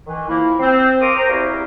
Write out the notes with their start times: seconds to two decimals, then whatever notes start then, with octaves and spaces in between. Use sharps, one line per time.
0.05 D#3 E3
0.27 F3 A#3 E4
0.59 C4
1.00 A#3 C4 A#4 C6 D6 D#6
1.16 C5 A#5
1.29 E2 C3 E4 F#4 G4 F5